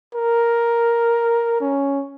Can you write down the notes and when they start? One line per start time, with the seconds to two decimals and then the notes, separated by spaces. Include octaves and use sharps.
0.15 A#4
1.61 C#4